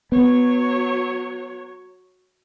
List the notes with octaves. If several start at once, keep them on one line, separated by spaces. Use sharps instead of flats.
F#3 B3 C#5